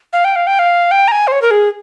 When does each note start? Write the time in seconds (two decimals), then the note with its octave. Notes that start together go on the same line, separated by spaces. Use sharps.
0.13 F5
0.24 G5
0.36 F5
0.47 G5
0.59 F5
0.91 G5
1.08 A#5
1.12 G#5
1.27 C5
1.32 C#5
1.42 A#4
1.51 G#4